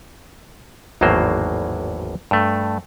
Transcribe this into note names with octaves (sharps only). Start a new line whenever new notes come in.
G#1 E2 A2 F#3 A#3 C5
G2 A3